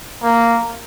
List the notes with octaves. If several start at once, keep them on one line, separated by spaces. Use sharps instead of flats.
A#3